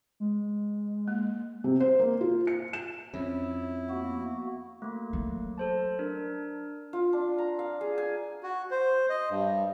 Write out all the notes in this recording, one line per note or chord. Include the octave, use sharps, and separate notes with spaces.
G#3
A#3
C3
C5
A#3
F4
C#7
E7
F2 C#4 E4
A#3 B3 F#4
A3 A#3
F#3
A4 C5 A5
D4 A#4
F4
D4
A#5
F5
G#4
G#5
F#4
C5
D#5
G2